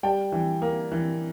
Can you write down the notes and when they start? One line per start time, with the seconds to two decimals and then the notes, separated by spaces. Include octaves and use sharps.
0.03 G3 G5 A5
0.32 E3
0.62 A#3
0.92 E3